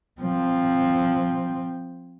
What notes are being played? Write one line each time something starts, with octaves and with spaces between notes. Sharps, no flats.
F3 C4